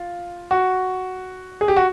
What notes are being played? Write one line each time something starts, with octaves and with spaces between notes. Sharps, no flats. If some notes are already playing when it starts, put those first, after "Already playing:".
Already playing: F4
F#4
G#4
G4
F#4